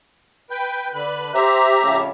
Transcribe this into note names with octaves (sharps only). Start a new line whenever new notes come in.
B4 G5
D3 B4 F#6
G4 C5 E5 A#5
F2 A2 C#3